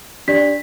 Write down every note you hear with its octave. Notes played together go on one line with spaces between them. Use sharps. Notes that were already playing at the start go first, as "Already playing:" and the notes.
D4 G4 D5 B6